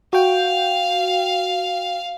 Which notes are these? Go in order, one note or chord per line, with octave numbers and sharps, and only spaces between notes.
F#4 F5 G5